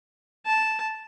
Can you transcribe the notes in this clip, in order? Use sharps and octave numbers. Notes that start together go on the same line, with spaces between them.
A5